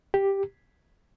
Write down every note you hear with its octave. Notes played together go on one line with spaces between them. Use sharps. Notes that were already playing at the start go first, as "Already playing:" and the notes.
G4